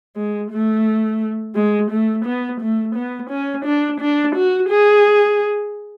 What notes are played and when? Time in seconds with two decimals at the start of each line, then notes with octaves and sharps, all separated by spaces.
0.17 G#3
0.51 A3
1.55 G#3
1.91 A3
2.25 B3
2.61 A3
2.95 B3
3.30 C#4
3.65 D4
4.00 D4
4.35 F#4
4.69 G#4